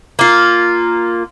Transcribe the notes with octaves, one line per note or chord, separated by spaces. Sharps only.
A#3 F4